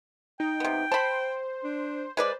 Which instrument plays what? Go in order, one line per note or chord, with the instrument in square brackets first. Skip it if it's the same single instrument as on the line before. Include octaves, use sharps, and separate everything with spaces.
[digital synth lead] D#4 [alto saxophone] G5
[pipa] C3 B3
[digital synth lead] C5 [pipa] A5 B5
[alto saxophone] D4
[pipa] G#3 B4 D5 [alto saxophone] C5